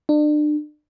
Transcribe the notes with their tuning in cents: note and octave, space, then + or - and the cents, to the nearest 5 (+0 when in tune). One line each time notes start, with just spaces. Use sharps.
D4 +35